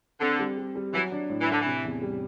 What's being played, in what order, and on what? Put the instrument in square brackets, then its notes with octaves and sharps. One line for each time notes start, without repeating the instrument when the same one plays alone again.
[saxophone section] D3 [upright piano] C4
[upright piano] G3
G3
G3
[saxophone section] E3 [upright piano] F#3
[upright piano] D4
A2
[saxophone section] E3
[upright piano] A2 [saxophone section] D3
[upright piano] C3 [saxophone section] E3
[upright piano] E2
G3